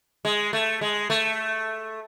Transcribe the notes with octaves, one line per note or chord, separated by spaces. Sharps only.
G#3
A3
G#3
A3